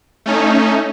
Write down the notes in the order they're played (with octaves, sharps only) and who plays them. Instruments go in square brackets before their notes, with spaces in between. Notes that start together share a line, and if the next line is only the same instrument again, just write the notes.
[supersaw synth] A3 C#4 D#4